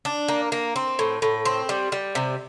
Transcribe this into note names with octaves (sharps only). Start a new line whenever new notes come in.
D4
A#3
A#3
C4
A2
A2
C4
G3
G3
C3